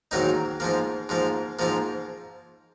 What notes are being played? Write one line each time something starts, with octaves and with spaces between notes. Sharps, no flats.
G#2 D#3 F#3 A#3 D#4
G#2 F3 A#3
G#2 F3 A#3
G#2 F3 A#3